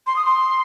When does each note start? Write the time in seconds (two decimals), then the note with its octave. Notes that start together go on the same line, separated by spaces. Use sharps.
0.07 C6
0.16 D#6
0.25 C6